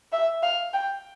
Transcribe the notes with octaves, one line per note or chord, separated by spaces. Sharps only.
E5
F5
G5